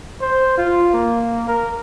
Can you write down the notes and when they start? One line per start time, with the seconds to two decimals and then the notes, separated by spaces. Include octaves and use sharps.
0.21 C5
0.58 F4
0.93 A#3
1.47 A#4